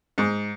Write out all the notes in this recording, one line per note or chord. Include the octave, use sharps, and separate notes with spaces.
G#2